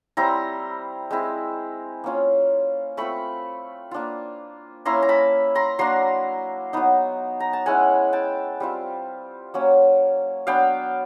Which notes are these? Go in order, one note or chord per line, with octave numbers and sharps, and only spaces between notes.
G3 C4 E4 A#5 C6
G#3 C4 E4
A#3 C#4 F4
A3 C4 F4 B5 C#6
A#3 D4 F4
A#3 C#4 E4 A#5 C6
A#5
A5 B5
A#5 C6
F#3 A#3 D4 A#5 C6
F#3 B3 D#4
A#5
A5
G#3 C#4 E4 F#5 G#5
G5 A5
G3 C4 F4
F#3 A#3 C#4
F#3 B3 D4 F5 G5